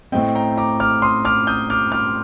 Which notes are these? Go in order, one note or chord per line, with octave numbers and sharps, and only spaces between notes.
A2 A3 C4 D#5 G5
G5 A#5
A#5 D6
D6 F6
C6 D#6
D6 F6
D#6 G6
D6 F6
D6 F6